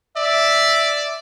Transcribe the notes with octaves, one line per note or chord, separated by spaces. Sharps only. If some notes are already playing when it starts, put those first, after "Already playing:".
D5 E5